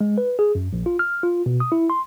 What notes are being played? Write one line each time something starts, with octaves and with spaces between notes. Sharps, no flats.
G#3
B4
G#4
F#2
A#1
F4
F6
F4
B2
D#6
E4
C6